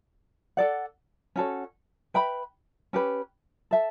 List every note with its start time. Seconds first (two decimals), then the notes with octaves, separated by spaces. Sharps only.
0.57 A4 D5 F#5
1.36 C#4 F#4 A4 C#5
2.14 B4 E5 G5 B5
2.93 C#4 G4 B4
3.71 A4 E5 A5